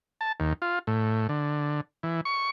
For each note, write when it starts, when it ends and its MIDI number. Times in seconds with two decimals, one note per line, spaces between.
0.21 0.32 81
0.40 0.53 39
0.62 0.79 65
0.87 1.27 45
1.29 1.81 50
2.03 2.21 52
2.25 2.50 85